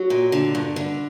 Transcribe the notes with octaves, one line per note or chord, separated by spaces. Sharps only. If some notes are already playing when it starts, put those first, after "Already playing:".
Already playing: F#3
A#2
D3
G2
D3